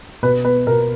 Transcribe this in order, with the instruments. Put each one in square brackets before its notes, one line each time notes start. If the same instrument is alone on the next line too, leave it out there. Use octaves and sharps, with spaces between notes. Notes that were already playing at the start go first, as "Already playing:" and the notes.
[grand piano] B2 B4
B3 B4
B2 A#4